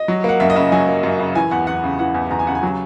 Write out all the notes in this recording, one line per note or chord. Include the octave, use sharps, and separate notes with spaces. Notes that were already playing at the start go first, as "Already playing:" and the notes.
Already playing: D#5
F#3
A#3 F#5
F#2 E5
D#5
C#3 E5
F#3 G#5
A#3
F#2
C#3
E3 G#5
E2 F#5
E2 F#5
C#3
E3 F#5
E2
E2 A#5
G#5
C#3 F#5
G#5
F#3